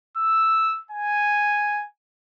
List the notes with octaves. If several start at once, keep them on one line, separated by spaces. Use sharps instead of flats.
E6
G#5